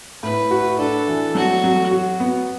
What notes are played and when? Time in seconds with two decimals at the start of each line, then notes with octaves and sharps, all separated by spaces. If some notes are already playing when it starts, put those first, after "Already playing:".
0.23 A2 B4
0.51 F#4
0.79 D4 A4
1.08 E3
1.35 F#3 F#4
1.64 F#3
1.91 F#4
2.20 B3